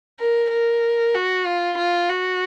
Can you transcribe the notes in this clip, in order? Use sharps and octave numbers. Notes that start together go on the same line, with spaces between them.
A#4
A#4
F#4
F4
F4
F#4